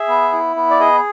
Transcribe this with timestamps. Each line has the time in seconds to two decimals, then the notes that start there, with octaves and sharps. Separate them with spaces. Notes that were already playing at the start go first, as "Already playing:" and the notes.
Already playing: G#4 E5
0.08 B3
0.33 E4
0.56 B3
0.70 D5
0.80 G#4 D#5